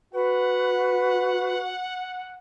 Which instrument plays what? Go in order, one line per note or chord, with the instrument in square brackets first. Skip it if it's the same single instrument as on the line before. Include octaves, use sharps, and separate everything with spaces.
[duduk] F#4 [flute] B4 [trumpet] F#5